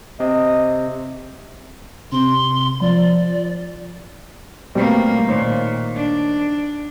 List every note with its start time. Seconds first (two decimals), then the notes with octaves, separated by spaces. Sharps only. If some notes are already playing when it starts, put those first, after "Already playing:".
0.20 C3 D#5
2.12 C3 C6
2.81 F3 D5
4.75 B2 G3 A3 A#3 C4
5.28 A#2 D#3 C5 C#5
5.96 D4